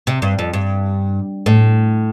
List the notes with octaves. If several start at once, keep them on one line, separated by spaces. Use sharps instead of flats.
C3
G2
F2
G2
A2